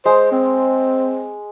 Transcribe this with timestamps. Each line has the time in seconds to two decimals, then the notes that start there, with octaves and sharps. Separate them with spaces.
0.05 G#3 C5
0.32 C4